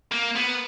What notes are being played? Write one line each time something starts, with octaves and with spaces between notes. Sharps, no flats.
A#3
B3